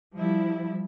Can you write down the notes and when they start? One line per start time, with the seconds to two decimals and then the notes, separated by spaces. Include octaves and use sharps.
0.15 F3 G3 E4